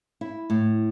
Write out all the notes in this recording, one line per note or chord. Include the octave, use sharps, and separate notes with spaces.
E4
A2